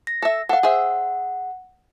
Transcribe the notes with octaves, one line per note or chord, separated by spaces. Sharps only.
A#6
A4 E5
A4 F5 F#5
G#4 C5 E5